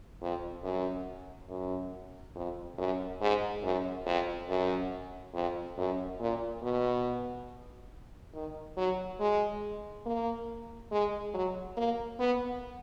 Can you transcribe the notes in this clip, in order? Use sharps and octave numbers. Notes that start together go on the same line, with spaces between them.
F2
F#2
F#2
F2
F#2
G#2
F#2
F2
F#2
F2
F#2
A#2
B2
D#3
F#3
G#3
A#3
G#3
F#3
A#3
B3